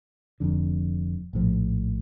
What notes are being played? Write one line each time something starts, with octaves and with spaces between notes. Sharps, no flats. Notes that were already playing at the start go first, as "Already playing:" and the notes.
F1 F2 D3
A#1 A2 F3